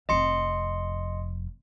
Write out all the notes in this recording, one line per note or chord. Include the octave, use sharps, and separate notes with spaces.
F1 F2 D#5 C6 C#7